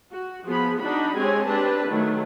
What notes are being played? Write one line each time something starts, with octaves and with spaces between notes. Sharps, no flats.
F#4
F3 B3 G#4 B5
D4 D#4 F#4 B5
G#3 C4 G4 C#5 G#5
C4 D4 G4 B4 A5
D#3 F#3 A3